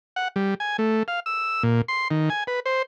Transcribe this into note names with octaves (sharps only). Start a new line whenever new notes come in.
F#5
G3
G#5
A3
F5
E6
A#2
C6
D#3
G#5
B4
C5